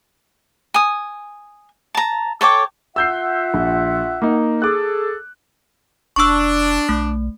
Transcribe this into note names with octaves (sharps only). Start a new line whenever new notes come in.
G#5 D#6
A5 A#5
A4 C#5 G5 D6
F4 E5 F#5 E6 G6 C7
A#1
A#3 D#4
G#4 A4 D6 F#6
F1 D4 C#6 E6
B1 A3